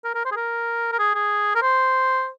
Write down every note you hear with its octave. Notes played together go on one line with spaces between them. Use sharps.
A#4
A#4
C5
G#4
A#4
A#4
G#4
G#4
A#4
C5